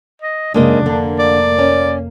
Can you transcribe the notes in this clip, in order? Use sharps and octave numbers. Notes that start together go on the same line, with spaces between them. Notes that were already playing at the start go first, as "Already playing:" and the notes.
D#5
F#2 C#3 G#3 A#3 D4 D#5
F1 D3 A#3
D5
C#4